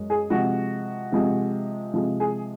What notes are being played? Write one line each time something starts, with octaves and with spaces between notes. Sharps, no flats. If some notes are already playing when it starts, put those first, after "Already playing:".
Already playing: F#2 G#3
G#4
C3 F3 G#3 F#4
C3 F3 G#3
C3 F3 G#3
G#4